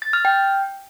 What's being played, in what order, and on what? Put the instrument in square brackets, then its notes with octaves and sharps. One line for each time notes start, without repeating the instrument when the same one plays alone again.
[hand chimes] A6
F6
G5